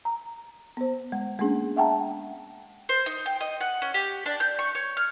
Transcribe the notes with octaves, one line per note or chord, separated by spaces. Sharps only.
A#5
B3 C5
G#3
G#3 A#3 B3 C#4 D4 G#4
E5 F#5 G5 A5 A#5
C5
D#4
G5
D#5
F#5
C#4
G4
D4
G6
C#6
C#5
F6